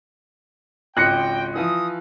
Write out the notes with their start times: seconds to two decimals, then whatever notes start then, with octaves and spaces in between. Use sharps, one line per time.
0.97 G#1 C#2 G5 F#6 A#6 C#7
1.55 E3 F3 D#6